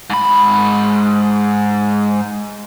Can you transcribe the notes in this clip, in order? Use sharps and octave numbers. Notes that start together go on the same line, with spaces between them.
G#2 B5